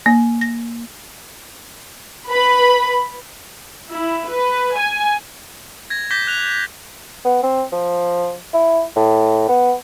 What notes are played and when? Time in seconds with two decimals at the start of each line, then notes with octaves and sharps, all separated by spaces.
0.06 A#3
0.41 A#6
2.28 B4 B5
3.89 E4
4.28 B4
4.76 G#5
5.90 G#6 A#6
6.11 D6 G6 A#6 B6 G7
6.27 F#6 F7
7.25 B3
7.43 C4
7.73 F3
8.54 E4
8.96 A2
9.49 B3